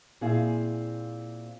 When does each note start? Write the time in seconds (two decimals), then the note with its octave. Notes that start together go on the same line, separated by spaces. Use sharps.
0.21 A#2 C4 E4 G#4 F5